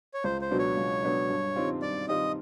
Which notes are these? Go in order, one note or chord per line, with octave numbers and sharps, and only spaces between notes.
C#5
C#2 C5
C5
B2 F#3 B3 D4
C#5
C#2
B2 F#3 B3 D4
G2
D#3 G3 C4 F4
G2 D5
D#3 G3 C4 F4 D#5